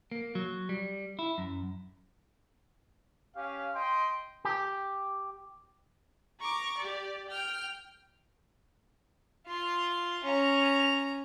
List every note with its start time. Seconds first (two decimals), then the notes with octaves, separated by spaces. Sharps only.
0.11 A#3
0.35 F#3
0.69 G3
1.19 E4
1.38 F#2
3.35 C#4 G4 F5
3.74 D#5 G5 C6
4.45 G4
6.39 A#5 C#6 D6
6.77 G4 D5
7.28 G5 F6
9.47 F4 C6
10.24 C#4 A#5